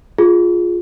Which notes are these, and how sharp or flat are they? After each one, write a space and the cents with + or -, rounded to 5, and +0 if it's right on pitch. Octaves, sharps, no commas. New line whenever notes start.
F4 +5 G#4 +0